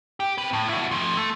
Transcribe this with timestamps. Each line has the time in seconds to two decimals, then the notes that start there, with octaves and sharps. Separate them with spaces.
0.20 G4
0.38 C4 B4
0.53 A2
0.69 E4 F#4
0.91 F3 A3
1.17 A3